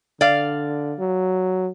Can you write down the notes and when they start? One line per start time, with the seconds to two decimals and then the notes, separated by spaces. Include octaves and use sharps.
0.21 D3 D5 F5
0.99 F#3